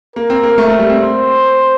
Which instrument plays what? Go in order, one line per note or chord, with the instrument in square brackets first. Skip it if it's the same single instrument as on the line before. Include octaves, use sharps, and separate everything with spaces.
[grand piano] A#3 [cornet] A#4
[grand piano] C4
A#3
A3
A3
G3
C4
[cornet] C5